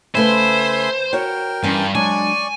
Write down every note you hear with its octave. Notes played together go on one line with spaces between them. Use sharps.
C#3 A3 B4 C5 E5 G#5 B5
F#4 A#4 C#5 G5
G2 E3 C#4 G#5
F#3 G#3 D4 D5 G#5 C#6